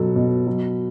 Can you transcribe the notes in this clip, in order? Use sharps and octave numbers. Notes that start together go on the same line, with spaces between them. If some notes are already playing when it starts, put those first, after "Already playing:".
Already playing: B2 F#3 A4
B2
F#3